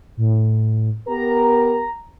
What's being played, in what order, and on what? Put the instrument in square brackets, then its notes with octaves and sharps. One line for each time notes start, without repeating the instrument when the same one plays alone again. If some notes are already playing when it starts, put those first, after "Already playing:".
[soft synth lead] A2
[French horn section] B3 G4 A#4 [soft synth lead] A#5